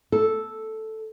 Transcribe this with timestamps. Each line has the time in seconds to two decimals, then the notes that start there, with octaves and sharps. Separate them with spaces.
0.12 A4